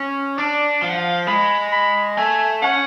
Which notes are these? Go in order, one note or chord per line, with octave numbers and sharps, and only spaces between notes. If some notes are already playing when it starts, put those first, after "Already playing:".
Already playing: C#4
D4 D5
F3 F5
F#5
F5
G#3 B5
B5
A3 G#5
C#4 F#5